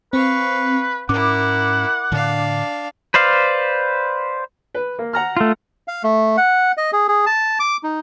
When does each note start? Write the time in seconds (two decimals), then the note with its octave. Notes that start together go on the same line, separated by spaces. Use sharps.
0.13 C4 B4 F5 C#6
1.09 G#2 C#4 E4 A#4 F#5 D6
2.12 A2 D3 D4 F5
3.14 B4 C5 D5 F5
4.75 B4
4.99 A#3
5.13 F#5 A#5 F6
5.37 A3 F4
5.88 F5
6.04 A3
6.37 F#5
6.77 D#5
6.93 G#4
7.08 G#4
7.26 A5
7.60 D6
7.83 D#4